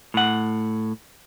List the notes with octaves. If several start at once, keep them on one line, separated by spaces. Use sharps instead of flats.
A2 F#5